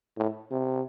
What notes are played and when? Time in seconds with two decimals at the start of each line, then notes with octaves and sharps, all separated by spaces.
0.17 A2
0.51 C3